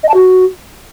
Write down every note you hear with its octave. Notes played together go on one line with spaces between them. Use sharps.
D#5
A5
F#4